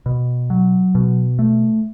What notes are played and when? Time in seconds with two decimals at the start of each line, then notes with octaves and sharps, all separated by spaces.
0.06 B2
0.50 F#3
0.95 B2
1.39 A3